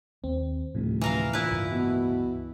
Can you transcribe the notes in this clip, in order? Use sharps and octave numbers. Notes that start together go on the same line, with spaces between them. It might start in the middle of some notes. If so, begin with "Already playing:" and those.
D#2 C4
D#1 D2 A2 C3 F3
E3 A#4 F5
A#2 E4 B4
C#2 G2
B2